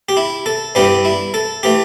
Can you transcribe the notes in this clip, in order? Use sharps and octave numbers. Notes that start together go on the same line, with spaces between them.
G4
E4
A4
G2 E3 G3 B3 G4
E4
A4
E3 A3 G4